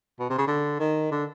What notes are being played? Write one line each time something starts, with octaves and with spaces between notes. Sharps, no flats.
B2
C3
C#3
D3
D#3
D3